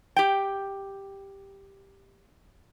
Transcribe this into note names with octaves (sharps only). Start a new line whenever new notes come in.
G4 G5